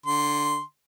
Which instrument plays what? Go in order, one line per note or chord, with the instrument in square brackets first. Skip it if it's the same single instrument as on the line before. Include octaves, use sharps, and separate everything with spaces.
[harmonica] D3 C6